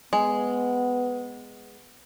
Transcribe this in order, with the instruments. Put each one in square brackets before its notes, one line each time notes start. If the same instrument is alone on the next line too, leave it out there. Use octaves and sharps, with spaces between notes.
[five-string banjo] G#3 [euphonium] B3